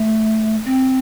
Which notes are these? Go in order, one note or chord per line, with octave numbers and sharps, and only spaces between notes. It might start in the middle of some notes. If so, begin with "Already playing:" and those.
Already playing: A3
C4